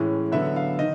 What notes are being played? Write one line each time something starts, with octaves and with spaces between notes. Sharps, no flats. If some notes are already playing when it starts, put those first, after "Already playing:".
Already playing: A2 E3 G#3 C#4
D3 F#3 B3 E5
F5
D#3 D#5